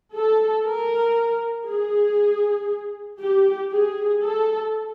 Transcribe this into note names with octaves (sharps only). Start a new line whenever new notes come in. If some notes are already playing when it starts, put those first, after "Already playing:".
A4
A#4
G#4
G4
G#4
A4